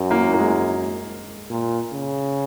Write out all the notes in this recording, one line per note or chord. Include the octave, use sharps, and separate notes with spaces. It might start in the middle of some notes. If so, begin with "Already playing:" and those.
Already playing: F#2
A#3
A#3
G#3
A#2
C#3